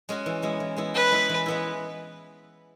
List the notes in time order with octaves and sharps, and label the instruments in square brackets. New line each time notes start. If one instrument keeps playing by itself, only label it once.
[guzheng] G#3 C#4 F#4
E3
G#3 B3 E4
E3
G#3 B3 E4
[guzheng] E3 [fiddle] B4
[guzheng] G#3 B3 E4
E3
G#3 B3 E4